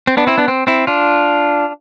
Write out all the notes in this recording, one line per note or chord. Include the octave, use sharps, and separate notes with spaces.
C4
B3 D4
C4 E4
B3 D4
C4
C4 E4
D4 F4